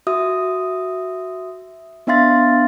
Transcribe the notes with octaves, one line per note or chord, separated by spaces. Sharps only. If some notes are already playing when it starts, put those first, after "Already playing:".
F#4 E5 D#6
B3 D4 E5 F5 C6 A6